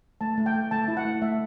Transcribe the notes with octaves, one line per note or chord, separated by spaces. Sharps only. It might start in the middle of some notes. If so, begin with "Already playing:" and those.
A3 A5
A3
G5
A3
A3 A5
E4
F#5
A3
A3 E5